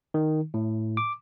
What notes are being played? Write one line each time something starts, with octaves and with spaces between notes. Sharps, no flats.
D#3
A2
D6